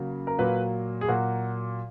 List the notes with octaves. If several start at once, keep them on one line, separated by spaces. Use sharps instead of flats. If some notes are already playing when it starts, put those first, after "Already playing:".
Already playing: C#3 F#3 A#3
A#4
A#2 F#3 A#3 B4
G#4
A#2 F#3 A#3 F#4